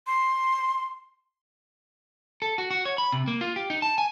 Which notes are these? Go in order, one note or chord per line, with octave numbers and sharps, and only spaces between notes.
C6
A4
F#4
F#4
C#5
B5
C3
A#3
F4
G4
D#4
A5
G#5